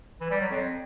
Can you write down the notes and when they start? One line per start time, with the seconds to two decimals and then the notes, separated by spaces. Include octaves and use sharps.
0.21 E3
0.31 G3
0.41 F#3
0.51 F2